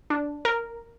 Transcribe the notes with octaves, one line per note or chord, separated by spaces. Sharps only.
D4
A#4